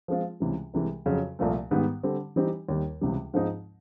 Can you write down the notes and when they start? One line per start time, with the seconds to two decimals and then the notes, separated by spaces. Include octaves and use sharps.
0.08 F3 G#3 C4 F4
0.40 C#2 C3 E3 G3
0.74 C2 C3 E3 G#3
1.06 F2 C#3 F#3
1.39 C2 A#2 F3 A3
1.71 G#2 D#3 G3 B3
2.03 D3 G3 C4
2.36 E3 G3 C4 D#4 G4
2.69 D#2 D#3 G3
3.01 C#2 C3 E3 G3
3.34 G#2 F3 G#3 C4 D#4